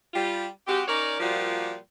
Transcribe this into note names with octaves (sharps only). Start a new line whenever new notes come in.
G3 F4
G#3 C4 F#4 G4
C#4 D#4 A#4 C#5 D5
A#2 F3 G3 A#3 F4 F#4